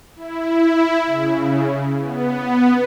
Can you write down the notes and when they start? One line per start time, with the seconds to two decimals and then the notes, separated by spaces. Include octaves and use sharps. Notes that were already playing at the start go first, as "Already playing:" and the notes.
0.16 E4
1.07 C#3
2.00 B3